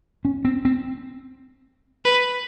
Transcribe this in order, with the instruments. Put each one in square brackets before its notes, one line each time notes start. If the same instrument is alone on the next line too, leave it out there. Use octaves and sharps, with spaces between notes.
[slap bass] C#4
C4
C4
[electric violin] B4